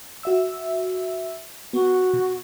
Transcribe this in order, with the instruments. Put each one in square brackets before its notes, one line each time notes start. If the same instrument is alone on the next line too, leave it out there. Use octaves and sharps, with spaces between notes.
[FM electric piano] F#4 E5 E6
[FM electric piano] B3 [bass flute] F#4
[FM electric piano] B2